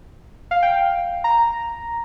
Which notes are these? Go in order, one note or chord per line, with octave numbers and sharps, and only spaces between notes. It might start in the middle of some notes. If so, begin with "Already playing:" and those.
F5
G5
A#5